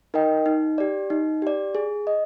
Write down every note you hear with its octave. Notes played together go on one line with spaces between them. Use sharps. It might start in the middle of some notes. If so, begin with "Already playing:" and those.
D#4 A#4 D#5 G5
D#4
G4 D5
D#4
G4 D5
G#4
D#5